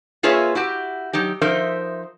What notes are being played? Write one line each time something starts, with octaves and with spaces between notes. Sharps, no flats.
A#3 F4 G#4 B4 C#5 E5
E4 F#4 G4
F#3 D#4 G4
F3 D#4 A#4 C5 E5